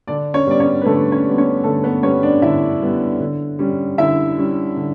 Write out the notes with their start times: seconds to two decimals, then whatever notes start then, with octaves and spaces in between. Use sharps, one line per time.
0.07 D3 D4 D5
0.34 C#4 C#5
0.46 G3 B3 D5
0.60 C#4 C#5
0.82 B4
0.85 D3 A3 A4
1.12 C#4 C#5
1.25 G3 B3
1.38 C#4 C#5
1.64 D3 A3 A4
1.84 B3 B4
2.03 G3 B3 C#4 C#5
2.23 D4 D5
2.42 D3 E4 E5
2.81 G3 B3
3.20 D3
3.59 G3 C#4
3.98 D3 E4 E5
4.38 G3 C#4
4.76 D3